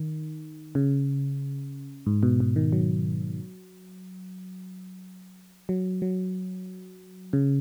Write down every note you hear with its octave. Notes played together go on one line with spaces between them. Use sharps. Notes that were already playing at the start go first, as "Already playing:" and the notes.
Already playing: D#3
C#3
G#2
B2
B2
D#3
F#3
F#3
F#3
C#3